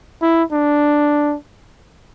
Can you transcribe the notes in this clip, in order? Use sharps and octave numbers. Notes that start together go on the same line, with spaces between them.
E4
D4